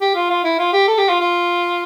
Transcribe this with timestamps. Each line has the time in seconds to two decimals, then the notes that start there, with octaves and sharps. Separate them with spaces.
0.01 G4
0.16 F4
0.30 F4
0.44 E4
0.59 F4
0.73 G4
0.88 A4
0.98 G4
1.09 F4
1.20 F4